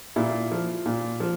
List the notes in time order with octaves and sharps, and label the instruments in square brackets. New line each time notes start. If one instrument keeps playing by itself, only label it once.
[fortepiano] A#2 E4
F3
A#2
F3